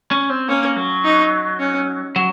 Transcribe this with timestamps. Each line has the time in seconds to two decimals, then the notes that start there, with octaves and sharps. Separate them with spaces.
0.11 C#4
0.30 C4
0.48 A#3 C#4
0.76 F#3
1.04 D#4
1.59 C#4
2.16 F#3